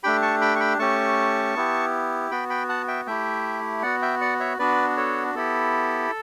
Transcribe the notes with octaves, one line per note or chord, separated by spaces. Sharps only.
A3 D4 G4 G5 B5
A5 C#6
G5 B5
C#6
G5 B5
A3 C#4 G4 A5 C#6
B3 E4 G4
B3 F#4 G5 B5
G5 B5
F#5 A5
E5 G5
A3 E4 G4 E5 G5
B3 F#4 D5 F#5
E5 G5
D5 F#5
C#5 E5
B3 D4 F#4 B4 D5
A4 C#5
B3 E4 G4 A4